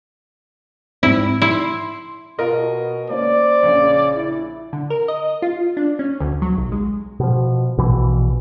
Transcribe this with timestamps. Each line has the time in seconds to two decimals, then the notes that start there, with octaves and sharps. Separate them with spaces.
1.03 G#2 C4 E4
1.42 E4 C6
2.39 B2 F4 A#4 D#5
3.10 A#3 C#4 C5 D5
3.63 A#1 C#3
4.15 E4
4.73 D3
4.90 A#4
5.08 D#5
5.42 F4
5.77 D4
5.99 C#4
6.20 D2
6.42 F#3
6.57 B1
6.72 G#3
7.20 B2 F3
7.77 A#1 B2 E3